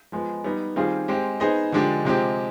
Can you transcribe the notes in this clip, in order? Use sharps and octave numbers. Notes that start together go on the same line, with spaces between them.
F3 G#3 B3
G3 B3 D#4
D#3 G3 C4 F4 G#4
G#3 C4 G4 C5
B3 D#4 G#4 C5 D#5
D3 F3 G#3 D4 G4
C3 F3 G#3 C4 G4